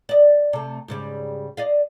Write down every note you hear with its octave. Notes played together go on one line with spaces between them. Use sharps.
D5 D#5
C3 A3
G#2 C#3 G3
D5 D#5 F5